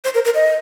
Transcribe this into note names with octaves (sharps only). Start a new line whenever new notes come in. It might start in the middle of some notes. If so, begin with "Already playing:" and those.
C5
A#4
A#4
D#5